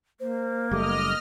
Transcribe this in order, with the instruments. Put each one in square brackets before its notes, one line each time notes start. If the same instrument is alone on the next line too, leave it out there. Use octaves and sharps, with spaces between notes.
[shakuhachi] A#3 [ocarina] C5
[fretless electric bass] F#1 G3 A3 [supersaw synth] D#5 F6 [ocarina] D6